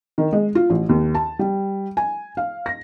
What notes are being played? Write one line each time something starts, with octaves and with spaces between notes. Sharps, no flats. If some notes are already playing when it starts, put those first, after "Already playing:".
D#3
G#3
F4
A1
D#2
A5
G3
G#5
F5
A#6